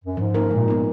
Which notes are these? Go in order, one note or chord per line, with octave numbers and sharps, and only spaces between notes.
F#2
G#2 F3
A#3 D#4 A#4
A#2 G#3
A#2 B3 D#4